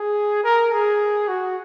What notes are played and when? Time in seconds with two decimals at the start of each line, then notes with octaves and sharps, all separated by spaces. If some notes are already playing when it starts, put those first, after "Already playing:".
Already playing: G#4
0.44 A#4
0.72 G#4
1.28 F#4